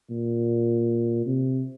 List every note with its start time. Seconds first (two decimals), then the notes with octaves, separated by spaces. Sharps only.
0.10 A#2
1.26 C3